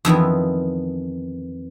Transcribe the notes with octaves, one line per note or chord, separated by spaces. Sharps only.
F2 D#3 E3 B3